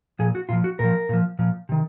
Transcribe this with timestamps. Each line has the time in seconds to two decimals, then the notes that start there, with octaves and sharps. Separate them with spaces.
0.19 A#2 F3 G#4
0.35 F#4
0.49 A#2 F3 F4
0.64 F#4
0.79 A#2 F3 A#4
1.09 A#2 F3
1.39 A#2 F3
1.69 C3 D#3